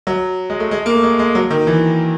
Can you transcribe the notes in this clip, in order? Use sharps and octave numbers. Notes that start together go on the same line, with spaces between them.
F#3
G#3
A3
G#3
A#3
A3
G#3
G#3
F#3
D#3
E3